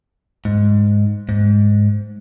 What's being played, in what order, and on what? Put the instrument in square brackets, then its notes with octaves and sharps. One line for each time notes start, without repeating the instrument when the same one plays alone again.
[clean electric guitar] G#2
G#2